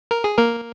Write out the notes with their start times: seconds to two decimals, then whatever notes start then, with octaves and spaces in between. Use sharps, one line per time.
0.11 A#4
0.24 G#4
0.38 A#3 A#4